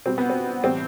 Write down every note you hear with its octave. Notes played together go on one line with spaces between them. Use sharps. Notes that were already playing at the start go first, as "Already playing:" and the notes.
B2 G3 C4
B3
C4
A2 E3 G3 C4